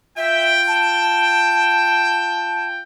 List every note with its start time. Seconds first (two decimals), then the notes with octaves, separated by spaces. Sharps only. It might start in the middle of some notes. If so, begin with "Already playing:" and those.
0.17 F4 E5 G5
0.68 A5